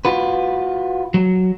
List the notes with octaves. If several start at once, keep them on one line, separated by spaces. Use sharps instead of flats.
F4 F#4 B4
F#3